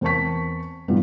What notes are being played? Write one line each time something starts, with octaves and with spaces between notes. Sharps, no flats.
E2 C4 A#4 A5 C#6 B6
G2 A#2 E3 G3 B3